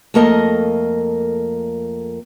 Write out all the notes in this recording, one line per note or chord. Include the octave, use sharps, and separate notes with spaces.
F2 A3 A#3 A4 A#4 D#5